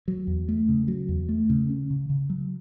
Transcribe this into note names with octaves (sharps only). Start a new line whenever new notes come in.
F#3
E2
A3
C#3
F#3
E2
A3
C#3
C#4
C#3
C#3
F#3